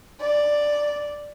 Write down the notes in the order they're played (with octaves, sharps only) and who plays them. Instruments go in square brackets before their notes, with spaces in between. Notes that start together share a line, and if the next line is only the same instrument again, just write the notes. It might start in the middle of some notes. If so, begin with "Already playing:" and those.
[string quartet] D5